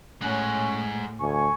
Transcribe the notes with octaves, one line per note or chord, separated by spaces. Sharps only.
A2 G#3 C#4 F#5
D2 G#5 C#6